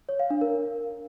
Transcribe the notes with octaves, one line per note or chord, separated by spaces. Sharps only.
C#5
F5
D4
A#4